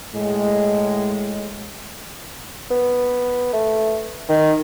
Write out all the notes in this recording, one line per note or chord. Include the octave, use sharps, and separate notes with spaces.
A2 G#3
B3
A3
D#3